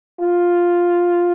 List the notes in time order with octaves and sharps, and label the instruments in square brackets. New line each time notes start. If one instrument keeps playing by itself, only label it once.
[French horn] F4